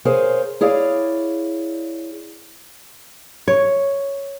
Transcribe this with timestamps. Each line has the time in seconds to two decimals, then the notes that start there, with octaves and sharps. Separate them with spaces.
0.05 G#4 A#4 C5 C#5 F5 G#5
0.61 E4 G#4 C#5 D5 F5
3.48 C#5